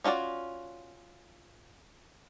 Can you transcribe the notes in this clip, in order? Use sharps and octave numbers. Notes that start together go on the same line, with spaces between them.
C#4 F4 F#4 A4 D5